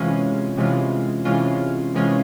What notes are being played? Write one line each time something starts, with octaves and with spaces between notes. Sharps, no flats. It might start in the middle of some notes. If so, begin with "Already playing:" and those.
Already playing: C3 E3 G#3 C#4 F4
C3 E3 G#3 C#4 F4
C3 E3 G#3 C#4 F4
C3 E3 G#3 C#4 F4